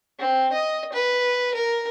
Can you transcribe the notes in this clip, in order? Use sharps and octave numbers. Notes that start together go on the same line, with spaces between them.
C4
D#5
B4
A#4